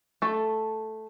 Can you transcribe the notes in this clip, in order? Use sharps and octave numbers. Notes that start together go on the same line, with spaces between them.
A3 A4